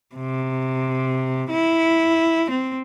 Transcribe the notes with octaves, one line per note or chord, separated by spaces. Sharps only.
C3
E4
C4